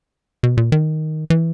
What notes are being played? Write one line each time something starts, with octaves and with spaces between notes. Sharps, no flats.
B2
A#2
D#3
E3